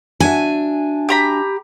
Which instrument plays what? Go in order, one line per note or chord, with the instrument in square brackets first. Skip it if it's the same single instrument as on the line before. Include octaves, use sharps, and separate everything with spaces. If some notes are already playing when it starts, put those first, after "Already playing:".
[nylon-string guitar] D4 F#4 E5 [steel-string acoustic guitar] G#5
[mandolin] G4 A#5 B5